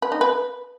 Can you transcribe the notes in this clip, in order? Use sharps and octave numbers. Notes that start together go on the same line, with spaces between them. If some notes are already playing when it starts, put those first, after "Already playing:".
B4
D#4
B4